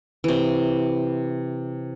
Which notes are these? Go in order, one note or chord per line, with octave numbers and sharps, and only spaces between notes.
C3 E3